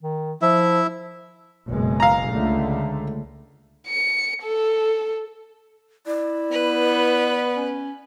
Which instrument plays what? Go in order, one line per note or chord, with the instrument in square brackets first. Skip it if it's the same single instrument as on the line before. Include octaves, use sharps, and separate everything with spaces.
[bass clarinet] D#3
[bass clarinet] F3 [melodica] E4 E5
[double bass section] F#1 B2 G#3
[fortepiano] F5 A#5
[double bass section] C#2 D3 A3
[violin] C#7
A4
[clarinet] E4 [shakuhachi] D5
[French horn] B3 [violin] B4
[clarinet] C#4